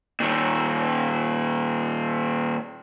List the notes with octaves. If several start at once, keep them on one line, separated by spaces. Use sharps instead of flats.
A#2 D#3